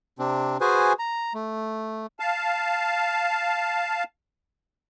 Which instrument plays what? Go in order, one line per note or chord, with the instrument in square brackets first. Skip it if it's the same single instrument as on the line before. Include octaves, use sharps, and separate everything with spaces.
[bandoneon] C3 C4 D4
F#4 G#4 B4 C5 G#5
A#5
A3
[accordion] F5 A5